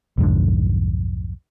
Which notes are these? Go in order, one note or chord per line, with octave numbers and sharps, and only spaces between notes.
B1 F2 G#2 D3